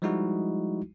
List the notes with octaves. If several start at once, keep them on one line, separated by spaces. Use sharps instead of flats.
F3 G3 G#3 D#4 E4 F#4